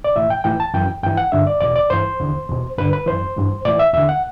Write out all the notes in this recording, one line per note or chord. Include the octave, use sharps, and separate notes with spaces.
D5
A2 E3 E5
G5
A2 E3 G5
A5
F#2 E3 G5
G2 E3 G5
F#5
G2 D3 E5
D5
E2 B2 D5
D5
G2 E3 C5
E2 D3
E2 B2
G2 D3 B4
B4
F#2 E3 C5
G2 E3
A2 E3 D5
E5
E2 D3 E5
F#5